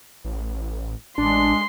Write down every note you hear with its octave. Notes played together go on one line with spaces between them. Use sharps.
A1
A1 G#3 D4 C6